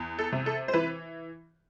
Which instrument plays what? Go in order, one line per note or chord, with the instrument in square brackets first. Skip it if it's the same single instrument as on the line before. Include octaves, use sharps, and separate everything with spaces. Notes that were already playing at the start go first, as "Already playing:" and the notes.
Already playing: [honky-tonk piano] E2
A4
C3
A4
C5
E3 B4